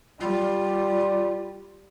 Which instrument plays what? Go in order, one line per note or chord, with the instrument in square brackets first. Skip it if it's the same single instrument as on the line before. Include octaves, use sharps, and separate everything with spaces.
[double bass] G3 [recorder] F4 [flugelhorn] D5